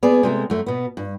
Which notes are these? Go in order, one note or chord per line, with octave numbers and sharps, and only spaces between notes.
B3 G#4 D5
C3 G#3 A3
F#2 A3
B2 B3
G2